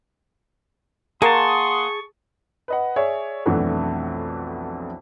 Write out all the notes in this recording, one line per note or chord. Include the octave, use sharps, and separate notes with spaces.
A#3 G#4 F#5 A5 C6 C#6 D#6
B4 D#5 F#5
G#4 C#5 D5 E5
B1 F2 E3 A3 D4 F#4